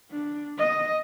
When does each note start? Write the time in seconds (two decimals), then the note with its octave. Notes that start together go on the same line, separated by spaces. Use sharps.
0.11 D4
0.58 D#5